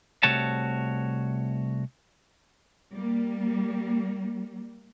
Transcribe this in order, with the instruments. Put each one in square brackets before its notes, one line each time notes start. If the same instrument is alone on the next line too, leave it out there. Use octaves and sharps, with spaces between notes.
[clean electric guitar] C2 C3 A3 F#4 C#5 A5
[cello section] G3 A#3